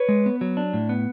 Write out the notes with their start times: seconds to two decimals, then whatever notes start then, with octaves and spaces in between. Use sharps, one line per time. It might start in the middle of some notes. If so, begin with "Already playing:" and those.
Already playing: B4 C#5
0.09 G#3
0.26 B3
0.41 F#3
0.57 D4
0.73 A2
0.89 B3